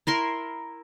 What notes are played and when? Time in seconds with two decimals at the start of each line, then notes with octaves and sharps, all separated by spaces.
0.07 E4 A#4 C6